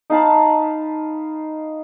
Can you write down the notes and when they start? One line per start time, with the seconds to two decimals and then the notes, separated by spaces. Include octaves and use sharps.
0.10 D#4 F5 A5 B5